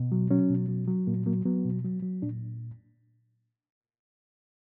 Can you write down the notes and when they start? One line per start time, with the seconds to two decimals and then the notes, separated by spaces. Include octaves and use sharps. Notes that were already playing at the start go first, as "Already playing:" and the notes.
Already playing: B2
0.12 F#3
0.31 F#3 C#4
0.50 B2
0.69 F#3
0.88 F#3
1.07 A#2 A#3
1.26 F#3 A#3
1.45 F#3 B3
1.65 B2
1.84 F#3
2.03 F#3
2.22 A#2 D4